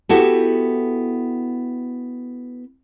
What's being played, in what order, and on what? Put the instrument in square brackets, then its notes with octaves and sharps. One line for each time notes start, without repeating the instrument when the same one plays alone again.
[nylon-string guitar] B3 E4 F#4 G4 A4